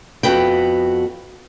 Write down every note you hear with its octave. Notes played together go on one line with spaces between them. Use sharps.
F2 B3 F#4 B4 G5